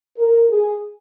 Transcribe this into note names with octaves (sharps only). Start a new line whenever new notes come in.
A#4
G#4